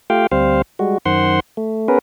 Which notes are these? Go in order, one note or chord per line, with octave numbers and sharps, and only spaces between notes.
A3 F4 G4 F5 G5
D2 G3 C4 C5 F5
G3 G#3 F#4
F#2 D#3 C5 F#5 C6
A3
B3 C#4 G#4 A#4 B4